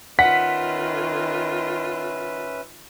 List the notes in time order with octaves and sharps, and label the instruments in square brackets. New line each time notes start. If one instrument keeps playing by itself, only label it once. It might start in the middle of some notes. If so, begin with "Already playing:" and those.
[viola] D#3 F4 [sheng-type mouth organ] C#4 B4 E5 [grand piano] F#5 [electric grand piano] B6